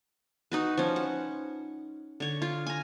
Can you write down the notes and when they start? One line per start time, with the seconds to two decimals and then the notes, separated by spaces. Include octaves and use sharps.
0.52 D#4 F#4 B4
0.77 F3 C#4
0.96 F#5
2.20 D3 C#5
2.42 F4
2.67 G#5 A#5